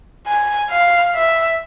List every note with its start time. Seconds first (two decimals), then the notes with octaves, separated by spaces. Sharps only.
0.27 G#5
0.71 F5
1.15 E5